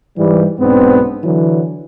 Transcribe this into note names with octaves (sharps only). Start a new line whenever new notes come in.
G#2 E3 G3
B1 G#2 B3 C4 D4
D3 E3 F#3